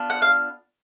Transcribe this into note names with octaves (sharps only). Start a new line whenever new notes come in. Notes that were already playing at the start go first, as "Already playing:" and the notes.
Already playing: B3 D4 F4
F#5
F5